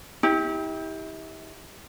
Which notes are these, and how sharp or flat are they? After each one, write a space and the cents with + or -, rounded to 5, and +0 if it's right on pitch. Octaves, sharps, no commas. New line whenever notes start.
E4 -40 G4 +15